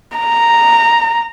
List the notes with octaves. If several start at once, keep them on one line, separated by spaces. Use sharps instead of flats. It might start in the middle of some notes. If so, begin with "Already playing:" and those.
A#5